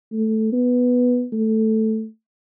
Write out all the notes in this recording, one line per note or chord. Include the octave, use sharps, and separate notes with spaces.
A3
B3
A3